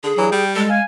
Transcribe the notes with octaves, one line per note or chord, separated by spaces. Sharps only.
D3 G#4
G2 E3 F#3
G3 G5
G#3 A4
F5 G#5